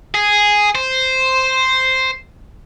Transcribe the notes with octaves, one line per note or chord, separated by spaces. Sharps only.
G#4
C5